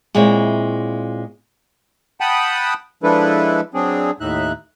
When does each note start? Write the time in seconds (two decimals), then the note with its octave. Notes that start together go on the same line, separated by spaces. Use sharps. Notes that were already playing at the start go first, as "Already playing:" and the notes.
0.15 A#2 G#3 C4 E4 C#5
2.20 F#5 G5 A5 B5 D#6
3.03 F3 G#3 D4 E4 A4 B4
3.74 F#3 C4 D4 G#4
4.20 D#2 A2 D#4 E5 F#6